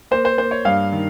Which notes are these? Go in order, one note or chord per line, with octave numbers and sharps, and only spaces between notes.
A#3 C5
C5
A#3 C5
C#5
G2 F5
D#3